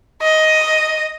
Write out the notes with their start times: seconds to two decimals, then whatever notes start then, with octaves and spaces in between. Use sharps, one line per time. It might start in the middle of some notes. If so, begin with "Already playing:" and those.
0.22 D#5